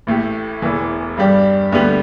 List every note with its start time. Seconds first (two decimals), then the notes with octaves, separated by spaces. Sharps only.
0.07 A1 A2 A3 G4
0.62 E1 E2 E3
1.17 G2 G3 D4 G4
1.72 D2 D3 G3 B3 G4